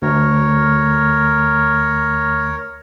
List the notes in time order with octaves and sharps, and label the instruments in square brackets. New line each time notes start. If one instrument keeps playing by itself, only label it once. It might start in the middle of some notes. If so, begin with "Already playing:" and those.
[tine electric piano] D2 [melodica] A#4 C#5